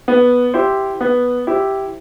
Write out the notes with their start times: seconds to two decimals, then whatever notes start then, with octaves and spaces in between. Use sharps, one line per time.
0.08 B3
0.54 E4 G4 C5
1.01 B3
1.47 E4 G4 C5